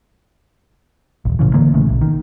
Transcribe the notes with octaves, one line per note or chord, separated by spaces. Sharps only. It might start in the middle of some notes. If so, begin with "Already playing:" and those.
D#1 A#1
A1 C#3 E3
D3 E3 A#3
A1 A2 C#3
B1
D#3